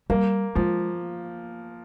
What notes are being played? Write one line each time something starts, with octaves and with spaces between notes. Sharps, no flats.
G3 A#3
F3 G#3